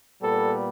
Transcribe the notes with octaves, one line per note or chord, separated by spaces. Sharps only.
A#2 G3 B3 A4